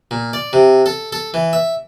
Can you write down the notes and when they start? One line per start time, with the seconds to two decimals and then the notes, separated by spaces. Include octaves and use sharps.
0.11 A#2
0.33 D5
0.53 C3
0.86 A4
1.12 A4
1.34 E3
1.53 E5